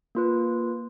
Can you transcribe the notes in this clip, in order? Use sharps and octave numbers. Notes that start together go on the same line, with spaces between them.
A#3 F4 B4